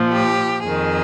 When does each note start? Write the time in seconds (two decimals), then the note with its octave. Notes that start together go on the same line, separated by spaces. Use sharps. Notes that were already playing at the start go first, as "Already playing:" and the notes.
Already playing: A#2 F3
0.13 G4
0.63 F2 D#3 G#4